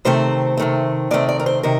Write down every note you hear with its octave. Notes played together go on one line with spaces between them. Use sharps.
C3 D#3 A3 C4 C5
C3 D#3 A3 C4
C3 D#3 A3 C4 D5
D5
A#4
C5
C3 D#3 A#4